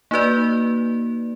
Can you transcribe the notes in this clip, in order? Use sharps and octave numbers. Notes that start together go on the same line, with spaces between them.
A#3 D#4 F#4 B4 D5